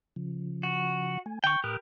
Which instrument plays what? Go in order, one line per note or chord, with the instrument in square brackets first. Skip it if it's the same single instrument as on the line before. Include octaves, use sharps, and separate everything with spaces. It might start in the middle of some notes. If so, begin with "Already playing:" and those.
[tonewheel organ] C#3 F3
[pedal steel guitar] F#4
[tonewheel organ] A3 G#5
[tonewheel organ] D3 [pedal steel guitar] G5 C#6
[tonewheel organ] A2 D#6 F#6 [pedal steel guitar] G4 A#4 B4